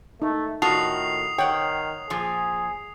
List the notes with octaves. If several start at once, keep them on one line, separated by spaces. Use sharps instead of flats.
A3 D#4
A2 D#3 F4 F#4 A5 D#6 C7 F7
D#3 C#5 F#5 G5
A#2 F3 G#4